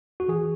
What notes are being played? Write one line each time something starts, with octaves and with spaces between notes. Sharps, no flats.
F#4
E3 G#4